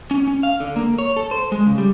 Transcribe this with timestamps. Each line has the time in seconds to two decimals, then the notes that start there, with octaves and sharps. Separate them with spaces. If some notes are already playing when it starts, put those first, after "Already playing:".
0.11 C#4
0.28 C#4
0.43 F5
0.60 D3
0.76 A#3
0.98 C#5
1.16 A4
1.31 C5
1.52 G#3
1.66 C#3
1.78 G3